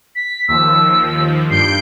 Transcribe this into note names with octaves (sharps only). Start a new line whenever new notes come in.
B6
D#2 F3 E6
G2 G6 C7 D7